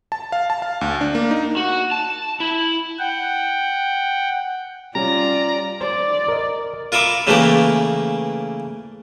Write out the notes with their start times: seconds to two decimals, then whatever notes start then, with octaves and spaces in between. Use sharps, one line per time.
0.12 A5
0.32 F5
0.50 A5
0.62 F5
0.81 D2
1.01 D4
1.15 A#3
1.31 D#4
1.57 F#4
1.92 A5
2.40 E4
2.99 F#5 G5
4.95 G3 C#4 F4 D5 A#5
5.81 C5 D5
6.28 A#4 D#5
6.92 F4 A#4 E5 B5 D6
7.27 C#3 E3 A3 A#3 G4 D6